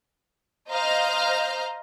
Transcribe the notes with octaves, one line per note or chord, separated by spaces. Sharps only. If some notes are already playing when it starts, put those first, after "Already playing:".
C5 D#5 F5 A#5 F6 G6